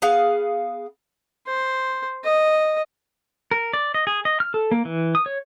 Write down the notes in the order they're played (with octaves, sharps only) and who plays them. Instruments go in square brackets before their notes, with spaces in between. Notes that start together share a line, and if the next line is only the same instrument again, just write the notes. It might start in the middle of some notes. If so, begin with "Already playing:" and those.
[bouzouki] B3 G#4 F5 F#5
[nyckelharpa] C5
D#5
[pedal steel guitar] A#4
D5
D#5
G#4
D#5
F6
A4
A#3
E3
D#6
C#5